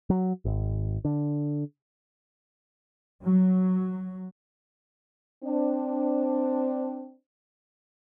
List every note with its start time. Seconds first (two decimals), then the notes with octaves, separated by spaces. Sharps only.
0.10 F#3
0.45 G#1
1.05 D3
3.23 F#3
5.44 C4 D4